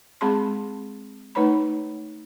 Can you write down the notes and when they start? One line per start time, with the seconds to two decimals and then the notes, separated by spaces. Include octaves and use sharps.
0.21 G#3 C4 G#4 A5 B5 C6
1.35 A3 D#4 B4 C#5 A#5 B5